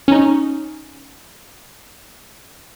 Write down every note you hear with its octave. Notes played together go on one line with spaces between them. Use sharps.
C#4 D#4